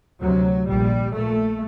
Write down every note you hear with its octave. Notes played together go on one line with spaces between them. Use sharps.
D2 C3 F#3
A#1 A#2 G3
A#1 A#2 A3